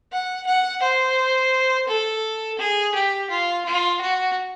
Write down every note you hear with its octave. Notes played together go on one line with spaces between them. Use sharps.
F#5
F#5
C5
A4
G#4
G4
F4
F4
F#4